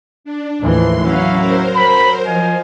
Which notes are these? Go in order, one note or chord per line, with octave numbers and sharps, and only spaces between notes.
D4
D#2 A2 E3 F3 C6
F#3 C#4 E4 F#4 F5
A#4 C5
B5
F3 D#5 F5 G#5